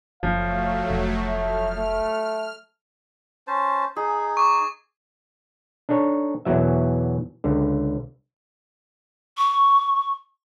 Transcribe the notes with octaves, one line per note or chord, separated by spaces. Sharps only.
F#1 F3 F#3 A3 F5
F1
A3 F6
A3
C#4 C5 A5
D#4 G#4
C#6 D6
D4 D#4 A4 C#5
E2 B2 E3 F#3 E5
C#2 D3
C#6